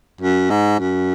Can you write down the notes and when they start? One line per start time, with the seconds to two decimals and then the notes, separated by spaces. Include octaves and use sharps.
0.21 F#2
0.50 G#2
0.80 F#2